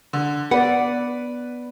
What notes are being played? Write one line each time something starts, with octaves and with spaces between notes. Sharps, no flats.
D3
B3 B4 D5 F#5